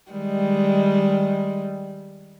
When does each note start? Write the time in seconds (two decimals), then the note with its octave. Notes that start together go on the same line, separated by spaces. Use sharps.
0.11 D#3 G3 G#3